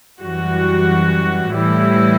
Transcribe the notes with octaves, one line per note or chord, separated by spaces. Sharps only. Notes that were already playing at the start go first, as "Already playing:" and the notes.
F#2 E3 G3 F#4
A2 E3 G3 E4